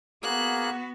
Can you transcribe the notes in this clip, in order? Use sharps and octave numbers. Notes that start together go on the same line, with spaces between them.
A#3 B3 F#4 G#4 F#6